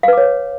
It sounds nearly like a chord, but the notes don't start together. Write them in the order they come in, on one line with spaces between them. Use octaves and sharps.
F5 B4 D6 C#5